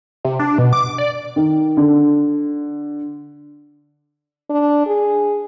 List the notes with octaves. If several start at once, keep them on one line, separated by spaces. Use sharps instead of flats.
C3
D4
B2
D6
D5
D#3
D3
D4
G#4